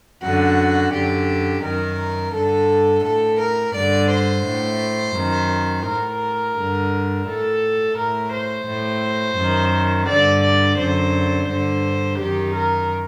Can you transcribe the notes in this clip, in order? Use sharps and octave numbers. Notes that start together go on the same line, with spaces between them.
F#2 D3 F#4
F#2 D3 G4
F#2 D#3 A#4
G2 D3 A4
A2 A4
A#4
G2 D3 D5
C5
A2
F#2 D#3
A2 A#4
G2 D3
A2 A4
A2 A#4
C5
A2
F#2 D#3
G2 D3 D5
D5
F#2 D3 C5
G2 D3 C5
F#2 D#3 G4
A#4